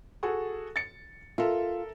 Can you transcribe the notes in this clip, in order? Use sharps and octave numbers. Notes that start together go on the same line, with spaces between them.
F#4 G#4 A4
A6 C#7
F4 A4 A#4 E5